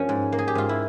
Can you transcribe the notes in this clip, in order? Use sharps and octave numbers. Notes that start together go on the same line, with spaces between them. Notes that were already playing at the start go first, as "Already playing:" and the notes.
Already playing: G2 F3 A#3 C#4
G#2
A#3
G#4
G4
G#2 F4
E4